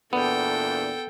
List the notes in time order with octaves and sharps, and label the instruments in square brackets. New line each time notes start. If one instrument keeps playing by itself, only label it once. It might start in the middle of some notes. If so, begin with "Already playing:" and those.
[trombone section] E2 A#2 D4 [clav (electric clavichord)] B3 [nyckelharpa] A4 G5